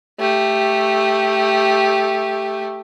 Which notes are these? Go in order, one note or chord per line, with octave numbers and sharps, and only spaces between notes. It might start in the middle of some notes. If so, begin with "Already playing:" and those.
A3 G4